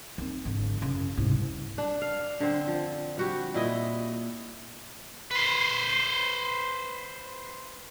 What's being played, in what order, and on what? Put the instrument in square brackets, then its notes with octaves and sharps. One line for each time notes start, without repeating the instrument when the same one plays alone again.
[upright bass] D#3 C4
G#1 D3
F#2 C#3
C2 G#2
[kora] D4
F5
D3 C4
F3
G3 F#4 G4
A#2 E4 D#5
[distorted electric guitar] B4 C5